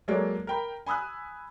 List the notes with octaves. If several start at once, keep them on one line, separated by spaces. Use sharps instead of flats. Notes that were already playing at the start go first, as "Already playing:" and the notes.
F#3 G#3 A#3 A4 C#5 D5
A#4 G5 B5
G#5 B5 D#6 E6 F#6